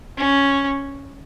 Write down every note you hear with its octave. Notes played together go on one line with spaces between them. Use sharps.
C#4